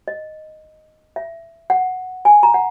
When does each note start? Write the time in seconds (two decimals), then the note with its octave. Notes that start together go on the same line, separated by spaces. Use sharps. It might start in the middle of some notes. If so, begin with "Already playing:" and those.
0.08 D#5
1.16 E5
1.70 F#5
2.25 G#5
2.43 A#5
2.54 F#5